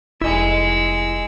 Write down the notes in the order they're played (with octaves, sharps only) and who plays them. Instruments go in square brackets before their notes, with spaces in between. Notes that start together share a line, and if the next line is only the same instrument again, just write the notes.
[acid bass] F1 [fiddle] G#3 E6 [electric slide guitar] E4 D#5